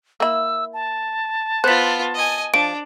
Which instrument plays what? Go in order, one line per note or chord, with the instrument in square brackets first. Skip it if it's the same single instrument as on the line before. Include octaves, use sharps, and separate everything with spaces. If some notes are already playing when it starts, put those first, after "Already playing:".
[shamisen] A#3 E4 [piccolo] E6
[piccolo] A5
[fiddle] B3 F4 [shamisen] C5 [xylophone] F#6 B6
[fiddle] D#5 G#5
[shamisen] F3 [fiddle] D4 [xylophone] D7